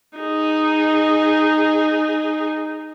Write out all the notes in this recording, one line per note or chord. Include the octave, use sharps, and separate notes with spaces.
D#4 G#4